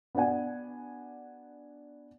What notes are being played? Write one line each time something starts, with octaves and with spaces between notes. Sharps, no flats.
B3 D4 F#4 D5 F#5 G#5